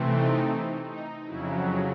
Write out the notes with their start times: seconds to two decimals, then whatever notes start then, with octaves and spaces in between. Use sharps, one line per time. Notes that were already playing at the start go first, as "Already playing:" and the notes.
Already playing: C3 E3 A3 C4
0.11 D#4
0.87 D#4
1.26 F2 C#3 F#3 E4